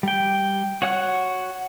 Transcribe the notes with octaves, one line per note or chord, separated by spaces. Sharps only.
G3 G5
F#4 C#5 F#5 F6 F#6